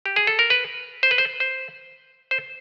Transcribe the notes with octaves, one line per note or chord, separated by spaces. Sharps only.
G4
G#4
A4
A#4
B4
C5
B4
C5
C5
C5